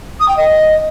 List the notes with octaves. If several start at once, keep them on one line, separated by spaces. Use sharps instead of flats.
D#6
G5
D#5